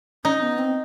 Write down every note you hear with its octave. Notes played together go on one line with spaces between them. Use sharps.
C#4 D#4
B3
C4